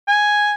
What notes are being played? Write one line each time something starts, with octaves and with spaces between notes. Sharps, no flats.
G#5